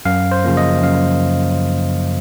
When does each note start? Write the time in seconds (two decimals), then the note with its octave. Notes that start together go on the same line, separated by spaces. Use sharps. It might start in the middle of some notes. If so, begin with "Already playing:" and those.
0.05 F#2 F5
0.32 C5
0.44 C#3 F3 A#3
0.57 D#5
0.82 F#2 F5